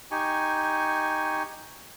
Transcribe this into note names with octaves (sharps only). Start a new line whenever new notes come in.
D#4 G4 G#5 C#6